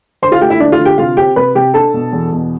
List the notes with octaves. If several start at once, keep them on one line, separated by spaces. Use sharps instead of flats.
D3 C5 C6
F4 F5
A3 G4 G5
E4 E5
D3 D4 D5
F4 F5
D3
G4 G5
C3 F4 F5
C4 G4 G5
C3 B4 B5
C3 G4 G5
D4 A4 A5
B2
E2
B2